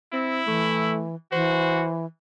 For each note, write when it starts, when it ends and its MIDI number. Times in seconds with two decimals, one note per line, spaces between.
0.13 0.41 60
0.13 0.94 64
0.47 1.15 52
0.47 1.05 57
1.32 2.06 52
1.32 1.85 66
1.32 1.96 72